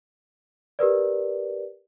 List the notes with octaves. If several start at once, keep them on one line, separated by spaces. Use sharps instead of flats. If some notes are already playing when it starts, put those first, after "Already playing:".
G4 A#4 B4 D5